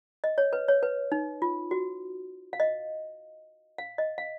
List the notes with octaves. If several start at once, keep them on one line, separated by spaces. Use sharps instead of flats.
D#5
C#5
B4
C#5
B4
D#4
F4
F#4
F5
D#5
F5
D#5
F5